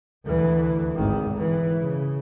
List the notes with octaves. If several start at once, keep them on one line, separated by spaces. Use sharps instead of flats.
D2 E3
G#1 D#3
E3
C#3